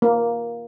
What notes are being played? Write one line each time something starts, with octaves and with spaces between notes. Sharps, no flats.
A#3